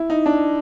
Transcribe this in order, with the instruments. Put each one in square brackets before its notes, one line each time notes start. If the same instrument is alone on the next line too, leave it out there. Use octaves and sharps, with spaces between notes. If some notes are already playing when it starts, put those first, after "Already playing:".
Already playing: [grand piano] E4
D#4
D4